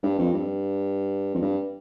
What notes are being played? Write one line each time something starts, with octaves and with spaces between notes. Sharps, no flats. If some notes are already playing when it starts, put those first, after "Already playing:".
G2
F2
G2
F2
G2